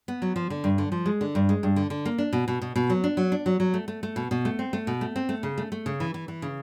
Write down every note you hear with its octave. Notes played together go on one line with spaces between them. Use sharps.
B3
F#3
F3
D3
G2
D3
F3
G#3
D3
G2
G#3
G2
D3
D3
A#3
D4
B2
B2
B2
B2
F#3
D4
F#3
D4
F#3
F#3
A3
A3
A3
B2
B2
A3
C4
A3
B2
A3
C4
A3
C#3
A3
A3
C#3
E3
E3
E3
C#3